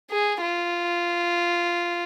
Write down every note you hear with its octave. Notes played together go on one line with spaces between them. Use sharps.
G#4
F4